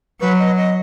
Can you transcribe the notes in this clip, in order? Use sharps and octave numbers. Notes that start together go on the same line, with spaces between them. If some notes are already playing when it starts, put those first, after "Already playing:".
F#3 B4
D#5
D#5